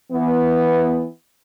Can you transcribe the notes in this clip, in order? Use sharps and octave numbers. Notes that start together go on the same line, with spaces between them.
E3 B3